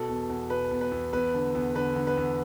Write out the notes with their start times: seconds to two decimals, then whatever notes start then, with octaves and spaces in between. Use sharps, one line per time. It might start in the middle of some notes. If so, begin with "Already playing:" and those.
Already playing: B2 A4
0.09 E2
0.30 E2
0.50 B2 B4
0.71 E2
0.81 B4
0.92 E2
1.13 E2 B4
1.34 D3
1.55 E2
1.75 D3 B4
1.96 D3
2.07 B4
2.17 E2